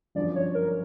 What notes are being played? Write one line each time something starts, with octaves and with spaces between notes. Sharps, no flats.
G1 F#2 D3 F3 D5
C#5
A#4